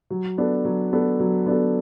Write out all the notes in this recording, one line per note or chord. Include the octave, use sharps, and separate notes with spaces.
F#3
B3 D4 A4
F#3
B3 D4 A4
F#3
B3 D4 A4